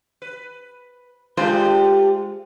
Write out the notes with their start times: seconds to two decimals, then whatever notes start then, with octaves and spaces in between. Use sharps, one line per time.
0.22 B4
1.37 G#3 A3 D4 F4 G4 C5